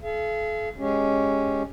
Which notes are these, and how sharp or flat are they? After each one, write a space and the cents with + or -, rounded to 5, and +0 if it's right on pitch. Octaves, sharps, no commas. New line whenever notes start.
A4 -45 F5 -40
G#3 +0 C#4 +0 G4 +0